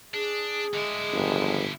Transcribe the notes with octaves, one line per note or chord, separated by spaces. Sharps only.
D4 G#4
D3 G#3 E4
G1 G2 D#3 F3